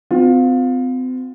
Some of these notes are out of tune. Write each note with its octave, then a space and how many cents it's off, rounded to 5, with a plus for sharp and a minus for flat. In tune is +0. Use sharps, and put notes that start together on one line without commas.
C4 -40 F4 +25